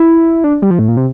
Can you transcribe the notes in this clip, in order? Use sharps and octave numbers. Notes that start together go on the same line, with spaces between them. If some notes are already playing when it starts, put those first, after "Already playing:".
Already playing: E4
D4
G3
F3
A2
A#2
C3